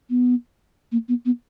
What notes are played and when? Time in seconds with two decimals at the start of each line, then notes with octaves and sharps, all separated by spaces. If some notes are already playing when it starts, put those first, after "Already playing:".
0.10 B3
0.92 A#3
1.08 B3
1.25 B3